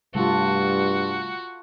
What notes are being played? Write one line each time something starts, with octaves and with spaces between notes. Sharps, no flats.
G2 C3 G3 A3 F4 F#4 A4